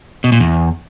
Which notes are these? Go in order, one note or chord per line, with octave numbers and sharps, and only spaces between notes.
B2
A#2
E2